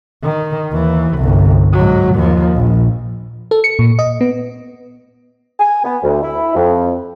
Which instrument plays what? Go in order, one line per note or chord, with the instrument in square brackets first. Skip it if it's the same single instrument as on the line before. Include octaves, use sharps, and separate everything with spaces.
[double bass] D#3
D#2 E3
G1 C2
G#2 F#3
D#2 F3
A#1
[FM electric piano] A4
C#7
A#2
D#5
B3
[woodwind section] G#5
B3
D2
E4
F2